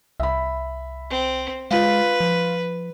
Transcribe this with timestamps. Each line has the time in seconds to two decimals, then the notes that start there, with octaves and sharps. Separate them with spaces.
0.20 C2 E5 B5
1.11 C4
1.71 G#3 F4 B4 F5
2.20 F3